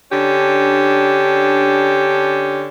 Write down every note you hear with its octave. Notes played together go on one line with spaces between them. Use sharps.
D3 C#4 D4 G4